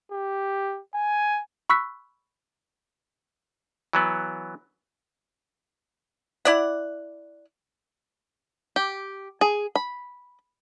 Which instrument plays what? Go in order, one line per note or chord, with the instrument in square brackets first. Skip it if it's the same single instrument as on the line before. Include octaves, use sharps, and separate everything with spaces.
[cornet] G4
G#5
[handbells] B5 C#6 E6 F#6 B6
[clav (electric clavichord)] E3 F#3 B3
[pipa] E4 D5 F#5
[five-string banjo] G4
G#4
B5